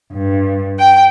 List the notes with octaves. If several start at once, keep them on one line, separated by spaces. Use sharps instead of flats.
G2
G5